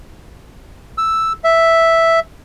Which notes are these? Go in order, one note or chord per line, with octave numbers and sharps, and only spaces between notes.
E6
E5